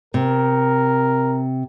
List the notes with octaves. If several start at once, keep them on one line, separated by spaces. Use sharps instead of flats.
C3 A#4